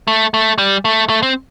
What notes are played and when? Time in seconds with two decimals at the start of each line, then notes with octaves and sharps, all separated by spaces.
0.08 A3
0.34 A3
0.58 G3
0.85 A3
1.09 A3
1.23 C4